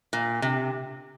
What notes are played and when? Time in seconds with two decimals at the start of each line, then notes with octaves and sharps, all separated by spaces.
0.13 A#2
0.42 C3